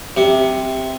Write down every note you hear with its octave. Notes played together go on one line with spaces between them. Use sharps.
C3